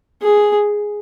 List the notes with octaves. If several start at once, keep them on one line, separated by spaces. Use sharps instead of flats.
G#4